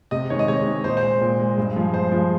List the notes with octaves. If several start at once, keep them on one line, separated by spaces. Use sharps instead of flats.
C3 D#5
D#3 G#3 C#5
D#5
C3 C#5
D#3 G#3
A#2 C5
C5
G#3
A#2
G#3
G2
F3 G#3
G2 C5
F3 G#3